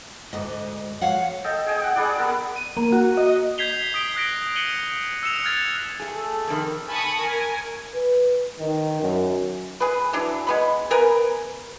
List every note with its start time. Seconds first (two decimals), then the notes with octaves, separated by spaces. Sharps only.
0.33 D2 G#2 D#5
1.01 C#5 F5 F#5
1.44 A4 D#5 G5
1.66 G#4 D#5 G5
1.83 F#5
1.96 G3 D4 G#4 D5
2.18 B3 A4 A#4
2.56 D#7
2.77 A#3
2.92 F#4
3.17 D#5
3.58 G6 G#6 B6 C7 F7 G7
3.94 D#6 B6 D7 G7
4.15 D#6 F#6 A#6 D7
4.56 C#7 D#7 F#7 G7
5.23 E6 C#7 E7 F7
5.44 F6 F#6 G#6 A6 C#7 F7
6.00 A3 G#4
6.16 A4
6.47 F2 D#3
6.88 G#5 A5 B5 C#6 D#6
7.20 A#4 G#5
7.94 B4
8.60 D#3
9.02 F#2
9.80 G#4 B4
10.13 E3 F#3 D4
10.47 G#3 B3 B5
10.91 B3 A#4 B4 G#5